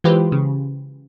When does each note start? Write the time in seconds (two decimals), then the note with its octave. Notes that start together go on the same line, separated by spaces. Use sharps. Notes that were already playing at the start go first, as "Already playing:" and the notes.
0.04 E3 G#3 F4 G4 B4 C5
0.32 C#3